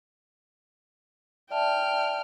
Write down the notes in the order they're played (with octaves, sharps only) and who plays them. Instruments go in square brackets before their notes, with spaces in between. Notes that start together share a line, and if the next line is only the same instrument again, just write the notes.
[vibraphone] D5 E5 A5 [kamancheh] G5 F6